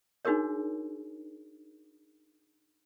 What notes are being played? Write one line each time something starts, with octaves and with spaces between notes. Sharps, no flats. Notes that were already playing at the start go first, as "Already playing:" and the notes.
D4 D#4 F#4 G#4 A#4 C#5